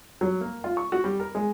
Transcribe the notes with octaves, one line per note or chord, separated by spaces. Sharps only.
F#3
A#3
F4
C#6
F#4
G3
A#4
G#3